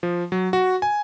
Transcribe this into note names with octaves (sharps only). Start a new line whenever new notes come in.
F3
F#3
F#4
G#5